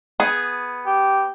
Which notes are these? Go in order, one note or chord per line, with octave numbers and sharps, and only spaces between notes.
B3 G#4
G4